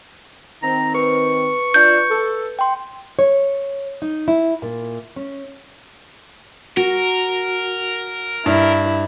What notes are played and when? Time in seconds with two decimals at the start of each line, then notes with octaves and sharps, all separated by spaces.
0.63 D#3 C4 A#5
0.94 B4 C#6
1.74 D4 F4 G6
2.11 A4
2.59 G5 C6
3.19 C#5
4.02 D#4
4.28 E4
4.62 A#2
5.16 C#4
6.77 F#4 A#4
8.46 G2 E4